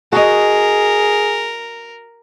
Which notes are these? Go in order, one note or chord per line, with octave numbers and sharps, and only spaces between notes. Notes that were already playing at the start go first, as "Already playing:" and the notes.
F#4 G#4 A#4 D#5